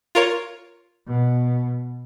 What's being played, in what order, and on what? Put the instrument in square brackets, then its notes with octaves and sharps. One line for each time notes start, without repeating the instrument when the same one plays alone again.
[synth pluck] F4 A#4 C#5
[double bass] B2